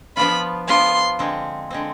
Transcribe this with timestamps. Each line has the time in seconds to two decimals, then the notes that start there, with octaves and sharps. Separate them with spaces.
0.17 F3 B3 D4 F4 B5
0.68 F3 B3 D4 F4 C6
1.19 D3 G#3 C4
1.71 D3 G#3 C4